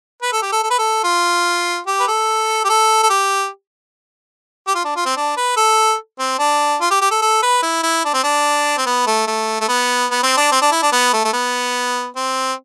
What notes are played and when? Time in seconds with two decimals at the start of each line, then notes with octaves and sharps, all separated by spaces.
0.22 B4
0.33 A4
0.42 G4
0.52 A4
0.63 A4
0.71 B4
0.79 A4
1.04 F4
1.87 G4
2.00 B4
2.08 A4
2.65 G4
2.69 A4
3.03 A4
3.10 G4
4.68 G4
4.75 F4
4.85 D4
4.96 F4
5.06 C4
5.17 D4
5.37 B4
5.57 A4
6.19 C4
6.39 D4
6.81 F4
6.91 G4
7.01 G4
7.11 A4
7.22 A4
7.43 B4
7.63 E4
7.83 E4
8.05 D4
8.14 C4
8.24 D4
8.78 C4
8.86 B3
9.07 A3
9.28 A3
9.61 A3
9.69 B3
10.11 B3
10.23 C4
10.37 D4
10.52 C4
10.62 D4
10.72 E4
10.82 D4
10.92 B3
11.14 A3
11.25 A3
11.33 B3
12.16 C4